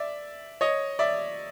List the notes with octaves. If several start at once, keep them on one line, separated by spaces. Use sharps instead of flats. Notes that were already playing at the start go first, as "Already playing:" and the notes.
Already playing: D5 E5
C#5 D#5
D5 E5